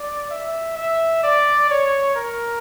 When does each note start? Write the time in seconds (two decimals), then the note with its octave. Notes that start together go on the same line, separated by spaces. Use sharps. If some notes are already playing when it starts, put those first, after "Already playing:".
Already playing: D5
0.31 E5
0.77 E5
1.24 D5
1.70 C#5
2.16 A#4